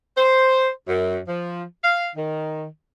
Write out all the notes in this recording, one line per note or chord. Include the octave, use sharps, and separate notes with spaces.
C5
F#2
F3
F5
D#3